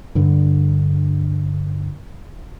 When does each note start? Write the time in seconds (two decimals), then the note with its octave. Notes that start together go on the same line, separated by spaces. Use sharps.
0.15 G2 D3